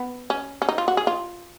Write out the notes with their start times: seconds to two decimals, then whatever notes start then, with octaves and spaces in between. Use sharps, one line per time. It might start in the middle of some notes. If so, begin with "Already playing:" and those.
Already playing: B3
0.30 C#4
0.62 C#4
0.69 D#4
0.78 F4
0.88 F#4
0.97 G#4
1.07 F4